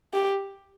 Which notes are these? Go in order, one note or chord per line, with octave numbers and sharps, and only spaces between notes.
G4